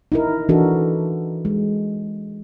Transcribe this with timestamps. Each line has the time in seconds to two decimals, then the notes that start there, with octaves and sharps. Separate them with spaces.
0.12 D#4 E4 A#4
0.49 E3 D4 D#4 F#4 A4 A#4
1.45 G#3